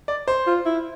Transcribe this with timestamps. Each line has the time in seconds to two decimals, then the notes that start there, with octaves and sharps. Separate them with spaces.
0.08 D5
0.28 C5
0.47 F4
0.66 E4